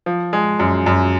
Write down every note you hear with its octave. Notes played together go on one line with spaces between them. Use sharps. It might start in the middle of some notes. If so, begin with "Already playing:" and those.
F3
G#3
F#2
F#2